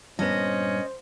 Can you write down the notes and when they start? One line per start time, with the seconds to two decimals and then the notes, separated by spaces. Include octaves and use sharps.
0.19 G2 A#2 B3 C#4 C5 D#5